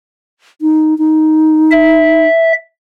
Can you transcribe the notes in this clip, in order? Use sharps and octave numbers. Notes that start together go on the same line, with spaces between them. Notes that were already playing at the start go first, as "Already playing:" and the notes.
D#4
D#4
E5